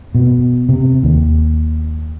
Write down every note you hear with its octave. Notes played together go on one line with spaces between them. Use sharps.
B2
C3
D#2